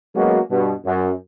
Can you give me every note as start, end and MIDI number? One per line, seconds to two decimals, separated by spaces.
0.15 0.39 54
0.15 0.39 56
0.15 0.39 58
0.15 0.39 59
0.15 0.39 61
0.15 0.39 66
0.51 0.74 43
0.51 0.74 47
0.85 1.12 42